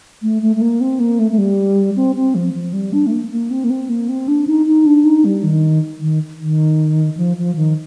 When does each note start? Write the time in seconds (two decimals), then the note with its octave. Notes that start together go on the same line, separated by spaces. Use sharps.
0.22 A3
0.42 A3
0.56 A3
0.61 A#3
0.81 C4
1.00 A#3
1.19 A3
1.31 A3
1.38 G3
1.96 C4
2.16 C4
2.35 F3
2.54 F3
2.73 G3
2.93 D4
3.07 A3
3.12 A#3
3.31 A#3
3.51 C4
3.64 A#3
3.70 C4
3.89 A#3
4.09 C4
4.28 D4
4.47 D#4
4.67 D#4
4.86 D4
5.05 D#4
5.25 G3
5.44 D#3
6.01 D#3
6.40 D#3
7.17 F3
7.37 F3
7.56 D#3